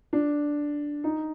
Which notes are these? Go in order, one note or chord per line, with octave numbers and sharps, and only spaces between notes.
D4
D#4